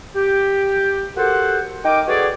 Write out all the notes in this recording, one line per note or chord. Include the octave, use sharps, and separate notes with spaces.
G4
F#4 G4 A4 A#4 C5 F#5
D#4 A#4 D#5 G5 D6
F#4 G#4 A4 B4 C#5 D5